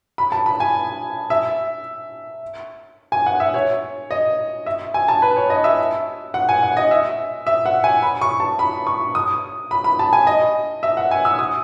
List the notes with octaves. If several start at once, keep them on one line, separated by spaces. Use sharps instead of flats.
B5
A5
B5
G#5
E5
G#5
F#5
E5
C#5
D#5
E5
G#5
A5
B4
C#5
D#5
E5
F#5
G#5
F#5
D#5
E5
E5
F#5
G#5
B5
C#6
A5
B5
C#6
D#6
B5
B5
A5
G#5
D#5
E5
F#5
G#5
E6
D#6